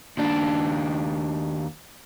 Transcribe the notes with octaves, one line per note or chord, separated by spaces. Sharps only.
D#2 D4